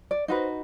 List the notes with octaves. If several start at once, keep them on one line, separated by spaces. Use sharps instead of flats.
D5
D#4 F#4 B4 C5